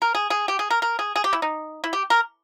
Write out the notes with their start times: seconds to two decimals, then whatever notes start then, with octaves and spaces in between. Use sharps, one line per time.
0.02 A#4
0.15 G#4
0.30 G#4
0.48 G4
0.59 G#4
0.70 A#4
0.82 A#4
0.99 G#4
1.16 G#4
1.24 G4
1.33 E4
1.42 D#4
1.84 E4
1.93 G4
2.10 A#4